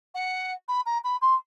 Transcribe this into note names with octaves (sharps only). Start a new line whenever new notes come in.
F#5
B5
A#5
B5
C6